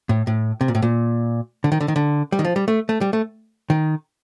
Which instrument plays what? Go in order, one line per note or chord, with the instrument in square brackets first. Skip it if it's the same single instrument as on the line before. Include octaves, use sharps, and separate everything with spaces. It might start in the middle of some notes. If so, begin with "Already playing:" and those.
[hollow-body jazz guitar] A2
A2
C3
A#2
A2
A#2
D3
D#3
D3
D#3
D3
G3
D#3
F3
G3
A3
A3
G3
A3
D#3